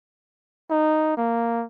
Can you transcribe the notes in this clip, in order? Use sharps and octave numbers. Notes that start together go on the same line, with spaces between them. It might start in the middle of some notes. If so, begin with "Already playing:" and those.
D#4
A#3